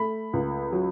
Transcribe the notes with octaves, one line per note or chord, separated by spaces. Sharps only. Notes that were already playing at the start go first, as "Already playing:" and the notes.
Already playing: A3 B5
C#2
F#3